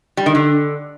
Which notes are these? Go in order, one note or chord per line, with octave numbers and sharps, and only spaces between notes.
G3
D#3
D3